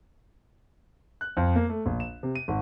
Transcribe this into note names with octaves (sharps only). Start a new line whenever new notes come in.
F#6
F2
A#3
A3
A#1
E7
C3
D#7
G#1